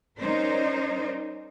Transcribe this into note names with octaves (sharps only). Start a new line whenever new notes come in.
G3 C#4 D#4 A#4 C5 D5